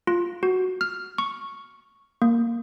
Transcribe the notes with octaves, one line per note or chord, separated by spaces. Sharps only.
F4
F#4
F6
C#6
A#3